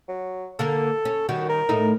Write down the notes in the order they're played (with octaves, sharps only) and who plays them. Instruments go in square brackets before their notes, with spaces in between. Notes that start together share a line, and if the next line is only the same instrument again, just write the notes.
[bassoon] F#3
[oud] D3 A#3 A#4 [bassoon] A4
[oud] C#4
[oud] D#3 G3 C#4 [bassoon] F#4
[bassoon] A#4
[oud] A2 A3 D#4